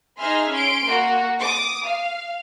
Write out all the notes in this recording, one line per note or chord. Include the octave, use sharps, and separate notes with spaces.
D#4 G#4 E5 G#5 C6 F6
C#4 C6 D7
A#3 F#4
D6 D#6
F5